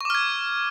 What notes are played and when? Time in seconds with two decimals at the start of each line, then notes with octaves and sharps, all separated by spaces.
0.01 C#6
0.05 D6
0.10 F6
0.15 G#6